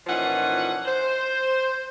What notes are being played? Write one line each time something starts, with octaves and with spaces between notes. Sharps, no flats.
A#2 E3 F3 C#4 D#4 F#5
C5